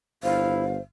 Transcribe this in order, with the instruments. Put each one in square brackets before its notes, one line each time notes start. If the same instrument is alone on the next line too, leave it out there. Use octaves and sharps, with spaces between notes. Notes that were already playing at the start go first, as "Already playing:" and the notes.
[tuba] G1 [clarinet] E4 [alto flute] C5 [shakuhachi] F5